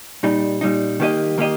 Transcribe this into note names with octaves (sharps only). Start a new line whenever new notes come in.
A#2 G3 D#4
A#2 G3 D#4
D#3 A#3 G4 D#5
D#3 A#3 G4 D#5